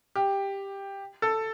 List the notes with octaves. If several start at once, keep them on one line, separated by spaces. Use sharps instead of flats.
G4
A4